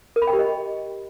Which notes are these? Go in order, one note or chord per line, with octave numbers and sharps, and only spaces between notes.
A#4
B5
G5
G4
D#5